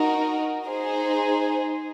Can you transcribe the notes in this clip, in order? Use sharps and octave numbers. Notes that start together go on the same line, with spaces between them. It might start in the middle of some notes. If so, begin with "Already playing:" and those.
Already playing: D#4 F#4 A#4
D#4 G#4 C5